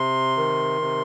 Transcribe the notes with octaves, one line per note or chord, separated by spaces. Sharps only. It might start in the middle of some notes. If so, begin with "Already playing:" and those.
Already playing: C3 C6
D#3
C3